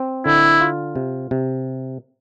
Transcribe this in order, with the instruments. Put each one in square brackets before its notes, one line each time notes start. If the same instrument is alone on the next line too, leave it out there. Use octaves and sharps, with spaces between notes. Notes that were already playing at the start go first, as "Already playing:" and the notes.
Already playing: [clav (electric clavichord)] C4
[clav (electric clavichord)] D3 [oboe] E4
[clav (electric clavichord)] F4
C3
C3